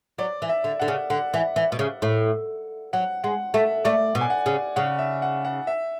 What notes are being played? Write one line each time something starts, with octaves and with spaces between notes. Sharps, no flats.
F#3 D5
E3
E5
D3
D3 F#5
C#3
D3 F#5
E3
E3
B2
C#3
A2
F#3 F#5
G#3 F#5
A3 E5
A3 D5
B2
G#5
F#5
C#3
C#3 F#5
E5
F#5
F#5
E5